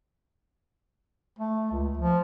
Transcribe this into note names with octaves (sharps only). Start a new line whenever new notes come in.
A3
C#2
F3